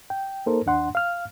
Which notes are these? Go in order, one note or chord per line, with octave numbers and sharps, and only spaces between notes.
G5
A#3 D#4 A4 A#4 C5
D#2 D4 F#5 C6
F5 F6